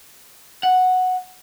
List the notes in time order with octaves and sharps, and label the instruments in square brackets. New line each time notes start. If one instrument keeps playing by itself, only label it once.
[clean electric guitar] F#5